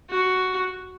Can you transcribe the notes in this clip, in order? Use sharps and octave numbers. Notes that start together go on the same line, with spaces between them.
F#4